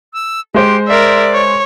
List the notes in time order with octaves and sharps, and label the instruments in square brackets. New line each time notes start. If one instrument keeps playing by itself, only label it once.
[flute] E6
[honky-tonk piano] G#3 C5 [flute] G4
[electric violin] A#4 E5 [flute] D5
[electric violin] C#5